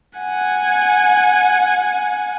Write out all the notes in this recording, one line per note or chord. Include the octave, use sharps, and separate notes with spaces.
F#5 G#5